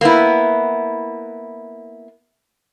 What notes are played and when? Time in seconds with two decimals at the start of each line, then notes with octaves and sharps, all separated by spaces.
0.01 A#3 B3 E4